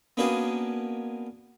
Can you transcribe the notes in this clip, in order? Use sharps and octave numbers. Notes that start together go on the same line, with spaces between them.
A#3 B3 C#4 D4 F#4 G#4